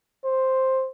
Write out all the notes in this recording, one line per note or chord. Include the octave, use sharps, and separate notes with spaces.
C5